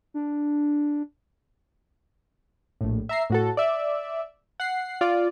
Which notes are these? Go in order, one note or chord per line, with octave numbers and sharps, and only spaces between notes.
D4
A#1 A2
E5 A#5 C7
A2 F#4 A4
D5 E5
F#5 C7
F4 D5